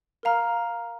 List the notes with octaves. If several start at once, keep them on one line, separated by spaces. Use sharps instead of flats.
A#4 F5 A#5 F6